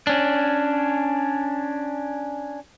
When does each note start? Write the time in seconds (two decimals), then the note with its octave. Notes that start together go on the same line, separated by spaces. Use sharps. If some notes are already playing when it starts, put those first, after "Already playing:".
0.07 C#4 D4